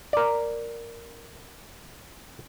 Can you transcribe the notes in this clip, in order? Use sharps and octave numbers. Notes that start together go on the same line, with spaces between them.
A#4 D5